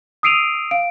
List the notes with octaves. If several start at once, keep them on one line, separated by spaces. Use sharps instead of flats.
D#6 E6 C7 D7 D#7 F7
F5 D7